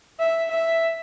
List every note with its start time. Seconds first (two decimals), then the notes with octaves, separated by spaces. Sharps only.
0.20 E5
0.50 E5